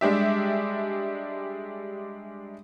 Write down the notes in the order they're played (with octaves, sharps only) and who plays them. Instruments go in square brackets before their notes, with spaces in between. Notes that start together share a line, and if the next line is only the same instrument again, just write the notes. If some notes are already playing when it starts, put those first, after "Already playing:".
[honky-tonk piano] G3 G#3 D4 G4 E5